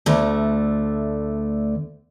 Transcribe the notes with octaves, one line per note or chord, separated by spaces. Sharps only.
D2 D3 A3